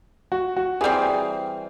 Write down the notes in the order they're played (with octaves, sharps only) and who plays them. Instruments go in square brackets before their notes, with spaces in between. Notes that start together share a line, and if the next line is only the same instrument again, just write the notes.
[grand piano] F#4
F#4
[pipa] E3 G3 C4 [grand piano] G#4